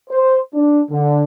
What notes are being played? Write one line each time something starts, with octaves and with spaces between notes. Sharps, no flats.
C5
D4
D3